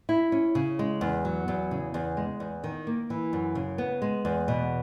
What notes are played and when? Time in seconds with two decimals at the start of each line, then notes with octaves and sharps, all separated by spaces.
0.09 E4
0.32 C#4
0.55 C#3
0.79 G#3
1.01 E2
1.25 F#3
1.48 E2
1.71 C#3
1.94 E2
2.17 G#3
2.40 E2
2.64 D#3
2.87 A#3
3.10 E3
3.33 F#2
3.55 C#3
3.78 B3
4.02 G#3
4.25 E2
4.48 B2